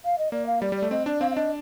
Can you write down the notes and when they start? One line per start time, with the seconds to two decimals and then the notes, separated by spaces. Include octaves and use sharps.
0.05 F5
0.18 D#5
0.32 A#3 D5
0.46 F5
0.62 G3 D5
0.72 G3 D5
0.82 A3
0.91 C4 D#5
1.06 D4 D5
1.21 C4 F5
1.31 F5
1.35 D4 D#5